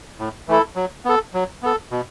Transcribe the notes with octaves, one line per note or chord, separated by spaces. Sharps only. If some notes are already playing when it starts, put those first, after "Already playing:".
A2
E3 A3 E4 A4
F#3
B3 A4
F#3
B3 A4
B2